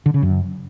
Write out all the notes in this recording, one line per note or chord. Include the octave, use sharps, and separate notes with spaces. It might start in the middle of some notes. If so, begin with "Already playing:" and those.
D3
C#3
F#2